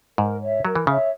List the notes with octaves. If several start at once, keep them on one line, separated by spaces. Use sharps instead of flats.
G#2 A#4
C#5 E5
F#3 A#4
E3
C#3 C#5 E5